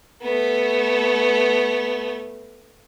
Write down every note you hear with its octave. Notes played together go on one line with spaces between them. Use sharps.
A3 B3